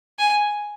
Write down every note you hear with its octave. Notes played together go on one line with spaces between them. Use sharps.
G#5